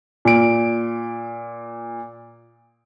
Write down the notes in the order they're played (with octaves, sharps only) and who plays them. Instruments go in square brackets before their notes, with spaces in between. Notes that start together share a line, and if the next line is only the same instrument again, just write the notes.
[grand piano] A#2 D7